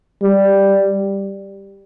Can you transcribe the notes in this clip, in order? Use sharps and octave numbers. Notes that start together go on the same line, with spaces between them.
G3